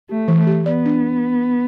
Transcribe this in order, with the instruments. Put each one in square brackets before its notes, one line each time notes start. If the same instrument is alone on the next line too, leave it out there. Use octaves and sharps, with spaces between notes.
[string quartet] A3 [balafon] G4
[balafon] E3
[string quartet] A3
[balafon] G4
[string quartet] B3 [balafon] D5
[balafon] D4